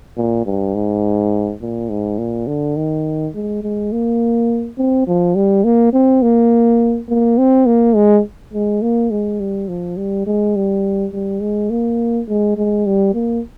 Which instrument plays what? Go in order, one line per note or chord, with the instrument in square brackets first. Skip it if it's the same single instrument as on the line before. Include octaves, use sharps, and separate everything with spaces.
[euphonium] A#2
G2
G#2
A#2
G#2
A#2
D3
D#3
G#3
G#3
A#3
C4
F3
G3
A#3
C4
A#3
A#3
C4
A#3
G#3
G#3
A#3
G#3
G3
F3
G3
G#3
G3
G3
G#3
A#3
G#3
G#3
G3
A#3